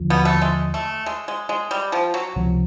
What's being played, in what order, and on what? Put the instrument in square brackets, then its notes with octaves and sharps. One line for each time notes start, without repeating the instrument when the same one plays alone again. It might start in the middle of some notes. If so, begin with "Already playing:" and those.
Already playing: [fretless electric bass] D#2 D3 F3
[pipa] B2 B3
A3
G#3
A3
G#3
G#3
G#3
G3
F3
F#3
[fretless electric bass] C#2 C3 F3